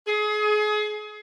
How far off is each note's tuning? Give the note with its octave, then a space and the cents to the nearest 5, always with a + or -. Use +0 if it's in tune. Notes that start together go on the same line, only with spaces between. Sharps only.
G#4 +30